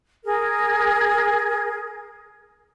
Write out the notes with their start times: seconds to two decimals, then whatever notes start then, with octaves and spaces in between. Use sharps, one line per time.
0.24 G#4 A#4